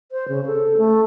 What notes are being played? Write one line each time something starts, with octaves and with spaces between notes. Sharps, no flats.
C5
C#3
A4
A3